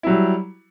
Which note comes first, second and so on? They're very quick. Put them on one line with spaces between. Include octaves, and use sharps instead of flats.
E4 F#3 G3